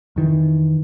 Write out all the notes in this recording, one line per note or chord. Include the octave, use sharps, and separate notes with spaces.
F2 D#3 E3